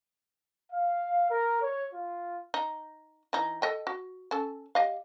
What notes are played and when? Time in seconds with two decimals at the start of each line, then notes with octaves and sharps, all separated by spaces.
0.71 F5
1.29 A#4
1.60 C#5
1.93 F4
2.54 D#4
3.33 E3 D#4
3.62 A4 D#5 G5
3.87 F#4
4.31 C#4 A4
4.75 G4 D#5 F5